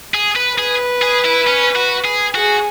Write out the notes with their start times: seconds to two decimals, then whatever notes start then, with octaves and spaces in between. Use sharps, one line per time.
0.14 G#4
0.36 B4
0.57 G#4 B4
1.02 G#4
1.24 E4
1.47 C#4
1.76 F#4
2.05 G#4
2.35 F#4 G#4